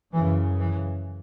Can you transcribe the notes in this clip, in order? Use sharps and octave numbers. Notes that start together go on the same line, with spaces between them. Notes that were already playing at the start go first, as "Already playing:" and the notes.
F#2 C#3 E3
E3